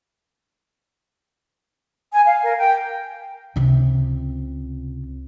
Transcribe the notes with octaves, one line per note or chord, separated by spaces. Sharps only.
G#5
F5
A#4
G5
C#2 C3